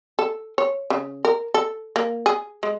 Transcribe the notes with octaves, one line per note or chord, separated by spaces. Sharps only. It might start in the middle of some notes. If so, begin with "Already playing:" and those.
A4
C#5
C#3
A#4
A4
A#3
G#4
G#3